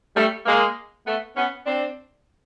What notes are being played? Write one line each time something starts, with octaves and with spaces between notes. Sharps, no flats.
G3 A3
G#3 A#3
A3 B3
B3 C#4
C4 D4